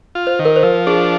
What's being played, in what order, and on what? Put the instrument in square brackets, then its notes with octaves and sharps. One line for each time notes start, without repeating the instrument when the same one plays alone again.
[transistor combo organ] F4
[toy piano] C5
[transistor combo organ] D#3
[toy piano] A#4
C5
[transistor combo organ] F3 [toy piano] A#4
[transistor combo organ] D4 [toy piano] G#4